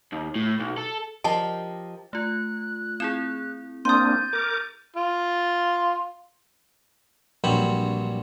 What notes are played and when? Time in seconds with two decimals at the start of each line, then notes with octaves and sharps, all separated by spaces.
0.12 D#2
0.36 A2
0.60 B1
0.78 A4
1.24 F3 G4 A#4 D#5 A5 C6
2.13 A3 F4 F#6
3.00 C4 E4 G#4 E7
3.85 A#3 C4 D4 C6 D#6 G6 A6 D#7
4.33 A#4 D6
4.96 F4
7.44 A#1 G2 F#3 C4 C#5 B5